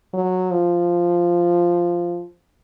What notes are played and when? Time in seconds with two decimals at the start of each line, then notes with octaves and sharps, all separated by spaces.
0.14 F#3
0.52 F3